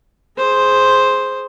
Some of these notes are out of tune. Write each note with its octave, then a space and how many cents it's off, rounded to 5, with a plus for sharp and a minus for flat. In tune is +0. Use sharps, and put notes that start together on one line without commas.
G#4 +10 C5 +0